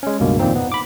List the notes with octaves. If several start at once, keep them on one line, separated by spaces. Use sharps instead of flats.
G#3 C#4
C#2 G2 B2 A#3
F2 A#2 D#3 A#3 C4 D#4
B3
B5 D6